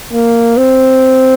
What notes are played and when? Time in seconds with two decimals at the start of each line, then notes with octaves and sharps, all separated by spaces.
0.13 A#3
0.57 C4